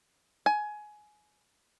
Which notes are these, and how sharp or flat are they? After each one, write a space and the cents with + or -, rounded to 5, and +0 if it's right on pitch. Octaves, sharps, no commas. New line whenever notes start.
G#5 +20